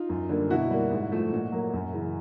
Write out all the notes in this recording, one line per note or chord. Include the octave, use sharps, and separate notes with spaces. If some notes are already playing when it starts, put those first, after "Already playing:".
Already playing: D#4 F4
F#2
D3 G3 A#3
B2 E4 F#4
G3 A#3
G#2
F3 A3
A#2
F#3 A#3
F#2
C#3 E3